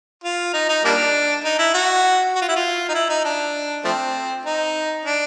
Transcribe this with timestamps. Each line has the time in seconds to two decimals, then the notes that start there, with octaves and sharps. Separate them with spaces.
0.24 F4
0.53 D#4
0.69 D#4
0.85 G3 A#3 D4
1.44 D#4
1.59 E4
1.74 F#4
2.35 F#4
2.41 F4
2.49 E4
2.56 F4
2.89 D#4
2.94 E4
3.09 D#4
3.25 D4
3.84 F3 A3 C4
4.45 D#4
5.05 D4